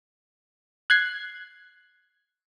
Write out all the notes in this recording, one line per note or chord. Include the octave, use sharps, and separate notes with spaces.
F#6 G#6 C7